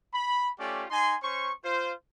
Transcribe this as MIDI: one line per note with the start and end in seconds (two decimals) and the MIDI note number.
0.14 0.50 83
0.59 0.85 57
0.59 0.85 61
0.59 0.85 65
0.59 0.85 67
0.59 0.85 74
0.91 1.16 63
0.91 1.16 80
0.91 1.16 84
1.23 1.51 61
1.23 1.51 72
1.23 1.51 85
1.64 1.92 65
1.64 1.92 72